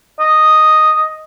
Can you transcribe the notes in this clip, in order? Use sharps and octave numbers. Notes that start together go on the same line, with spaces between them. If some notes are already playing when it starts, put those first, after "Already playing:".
D#5